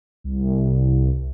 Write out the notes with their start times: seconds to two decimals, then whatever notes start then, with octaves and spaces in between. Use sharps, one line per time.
0.24 C2